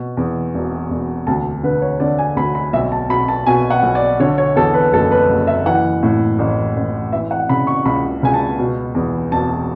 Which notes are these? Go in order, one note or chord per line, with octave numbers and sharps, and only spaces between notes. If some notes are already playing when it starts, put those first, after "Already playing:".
Already playing: B2
E2
E1
E1
D2 A5
D3 B4
C#5
D3 D5
G#5
D2 B5
B5
B1 E5
A5
B2 B5
A5
B2 G#5
F#5
B1
D5
D3 C#5
C#5
E2 A4
B4
F#1 A4
B4
F#1
E5
E3 F#5
A2
A1
A1
E3 E5
F#5
C#3 B5
C#6
C#2 B5
C#2 G#5
A5
B2
E2
E1 A5